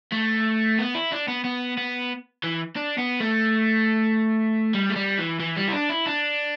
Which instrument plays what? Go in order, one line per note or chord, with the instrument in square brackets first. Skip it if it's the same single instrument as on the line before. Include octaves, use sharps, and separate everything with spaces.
[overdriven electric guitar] A3
B3
E4
D4
B3
B3
B3
E3
D4
B3
A3
G3
A3
G3
E3
E3
G3
E4
D4
E4
D4